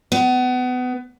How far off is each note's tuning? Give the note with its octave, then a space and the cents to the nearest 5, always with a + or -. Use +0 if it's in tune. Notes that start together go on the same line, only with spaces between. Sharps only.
B3 +25